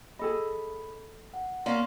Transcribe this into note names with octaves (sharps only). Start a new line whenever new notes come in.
G#4 A4 D#5 B5
F#5
A#3 C#4 C#5 D5 C6